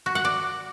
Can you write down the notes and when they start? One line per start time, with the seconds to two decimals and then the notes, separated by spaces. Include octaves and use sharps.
0.06 F#4
0.15 F#5
0.25 D5